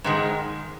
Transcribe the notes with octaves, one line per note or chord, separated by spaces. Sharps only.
G#2 D#3 G#3